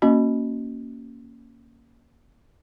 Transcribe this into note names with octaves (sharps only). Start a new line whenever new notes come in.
A#3 C#4 F#4 D#5